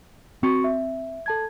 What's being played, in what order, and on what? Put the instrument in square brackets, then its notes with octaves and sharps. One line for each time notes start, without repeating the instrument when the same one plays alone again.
[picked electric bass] C4 [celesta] F#4 C#6 C#7
[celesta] E5
A4 A5 G#6